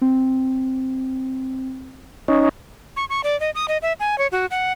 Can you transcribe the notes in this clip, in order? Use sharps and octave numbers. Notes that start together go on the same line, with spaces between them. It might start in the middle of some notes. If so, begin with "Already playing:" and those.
C4
C#4 D#4
C#6
C#6
D5
D#5
D#6
D#5
E5
G#5
C#5
F#4
F#5